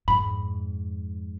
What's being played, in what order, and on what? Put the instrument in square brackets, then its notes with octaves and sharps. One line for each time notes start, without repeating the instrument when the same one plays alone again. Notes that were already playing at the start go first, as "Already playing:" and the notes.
[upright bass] F2 G#2 [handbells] B5